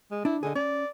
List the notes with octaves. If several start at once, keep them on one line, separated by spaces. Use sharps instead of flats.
G#3
D4 E4
D3 G#4 D#5
C#4 D5